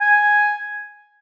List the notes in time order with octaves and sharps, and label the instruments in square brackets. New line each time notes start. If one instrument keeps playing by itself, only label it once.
[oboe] G#5